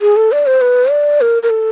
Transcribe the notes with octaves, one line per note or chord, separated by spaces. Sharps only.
G#4
A4
D5
C5
B4
D5
A#4
A#4
A4